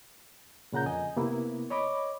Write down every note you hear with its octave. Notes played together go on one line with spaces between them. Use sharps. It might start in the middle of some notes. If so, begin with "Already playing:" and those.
A#2 C#3 F#5 A#5 G6
F2 D#5 G#5
C3 A#3 B3 E4
C#5 D#5 B5 D6